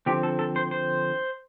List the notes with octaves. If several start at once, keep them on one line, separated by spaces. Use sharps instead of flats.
D3 F3 C4 G4
A4
A4
C5
C5